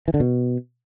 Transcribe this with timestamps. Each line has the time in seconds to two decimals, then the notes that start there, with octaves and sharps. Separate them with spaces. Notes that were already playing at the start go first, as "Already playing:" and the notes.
0.08 E3
0.14 D3
0.20 B2